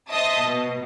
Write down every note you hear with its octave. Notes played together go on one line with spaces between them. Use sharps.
C5 D#5 E5 A5 D#6
B2